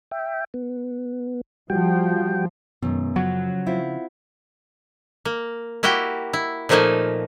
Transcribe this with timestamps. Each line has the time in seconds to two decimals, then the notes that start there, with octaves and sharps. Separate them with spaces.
0.11 E5 G5
0.54 B3
1.70 F3 G3 F#4 G5
2.82 F#2 B2 D#3 G#3 B3
3.16 C#3 F3 F#3 F#5
3.66 C4 E4 F4
5.25 A#3
5.83 A#3 E4 F#4 G4 G5
6.33 E4
6.69 A#2 F3 A3 A#3 D#4 G#5